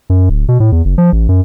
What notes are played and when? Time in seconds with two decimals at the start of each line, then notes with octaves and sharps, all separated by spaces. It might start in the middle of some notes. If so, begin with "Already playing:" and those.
0.10 F#2
0.29 D1
0.48 B2
0.60 A2
0.72 E2
0.85 F#1
0.98 F3
1.12 A1
1.29 F#2